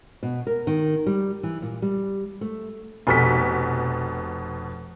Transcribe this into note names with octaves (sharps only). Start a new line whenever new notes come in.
B2
A#4
D#3
G3
E3
A#2
G3
A3
F1 B2 B6